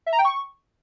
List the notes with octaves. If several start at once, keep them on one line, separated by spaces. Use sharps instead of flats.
E5
A#5
G5
C#6